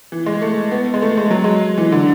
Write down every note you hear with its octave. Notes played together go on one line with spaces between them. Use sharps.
E3
G#3
A3
B3
G#3
A3
G#3
F#3
G#3
E3
D3